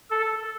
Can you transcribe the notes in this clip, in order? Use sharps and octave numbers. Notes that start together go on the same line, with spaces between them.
A4